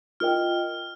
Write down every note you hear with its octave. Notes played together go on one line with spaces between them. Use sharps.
F4 A#4 D#5 G5 F6